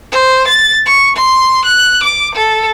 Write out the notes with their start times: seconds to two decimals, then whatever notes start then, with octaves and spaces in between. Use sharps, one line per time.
0.12 C5
0.48 A6
0.86 C#6
1.16 C6
1.65 F#6
2.03 D6
2.35 A4